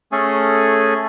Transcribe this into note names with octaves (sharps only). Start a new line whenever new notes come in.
A3 C#4 G#4 A4 G#5